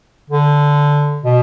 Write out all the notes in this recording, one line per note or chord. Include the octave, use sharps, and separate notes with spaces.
D3
B2